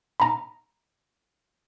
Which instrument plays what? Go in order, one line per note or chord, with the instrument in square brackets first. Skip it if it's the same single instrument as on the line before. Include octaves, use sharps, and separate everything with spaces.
[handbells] A#5 B5